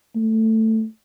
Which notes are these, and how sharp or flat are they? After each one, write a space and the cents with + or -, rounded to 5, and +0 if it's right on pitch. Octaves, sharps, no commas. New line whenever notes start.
A3 +10